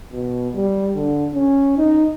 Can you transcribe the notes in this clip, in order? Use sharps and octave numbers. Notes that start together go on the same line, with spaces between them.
B2
G3
D3
C#4
D#4